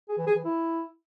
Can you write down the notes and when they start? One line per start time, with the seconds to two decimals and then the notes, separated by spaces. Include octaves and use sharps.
0.09 G#4
0.18 E3
0.27 G#4
0.36 E3
0.45 E4